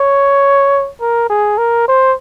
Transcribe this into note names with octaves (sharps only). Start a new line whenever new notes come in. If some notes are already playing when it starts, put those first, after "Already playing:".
Already playing: C#5
A#4
G#4
A#4
C5